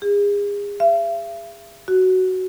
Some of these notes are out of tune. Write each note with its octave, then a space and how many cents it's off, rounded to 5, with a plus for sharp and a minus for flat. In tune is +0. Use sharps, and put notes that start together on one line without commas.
G#4 -35
E5 +45
F#4 +10